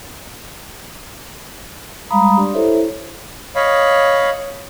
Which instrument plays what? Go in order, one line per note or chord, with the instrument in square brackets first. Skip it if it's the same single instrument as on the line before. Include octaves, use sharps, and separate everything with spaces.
[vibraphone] G3 G#3 F5 A#5 B5 D#6
D4 G4 D5 C6
E4 A4 C5 C#5 E5
[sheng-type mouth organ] C#5 D#5 F5 B5